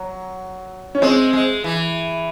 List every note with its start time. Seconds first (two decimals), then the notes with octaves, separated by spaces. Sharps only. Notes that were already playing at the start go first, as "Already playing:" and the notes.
Already playing: F#3
0.95 C#4
1.02 G#3 C4
1.33 G#3
1.64 E3